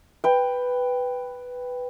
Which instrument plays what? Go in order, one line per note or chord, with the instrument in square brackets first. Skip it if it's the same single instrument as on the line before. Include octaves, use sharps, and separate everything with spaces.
[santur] B4 G5